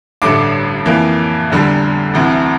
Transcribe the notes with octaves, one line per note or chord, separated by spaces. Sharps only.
A1 G2 D3 A3 D6
F2 E3 A#3
F1 E2 D3 G3
E1 D2 C3 E3